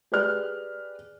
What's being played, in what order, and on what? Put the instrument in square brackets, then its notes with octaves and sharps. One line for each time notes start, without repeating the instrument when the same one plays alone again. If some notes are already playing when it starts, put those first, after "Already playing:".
[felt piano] G4 G#4 B4 D5 F6 F#6